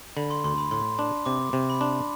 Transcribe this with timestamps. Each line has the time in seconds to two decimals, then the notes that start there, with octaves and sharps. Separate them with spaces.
0.16 D3 B5
0.30 C6
0.44 D2 C6
0.58 B5
0.71 A2 C6
0.99 D4
1.26 C3 D6
1.53 C3
1.70 B5
1.81 D4 C6